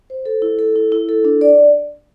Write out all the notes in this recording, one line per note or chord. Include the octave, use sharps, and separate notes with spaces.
C5
A4
E4
A4
E4
E4
A4
D4
D5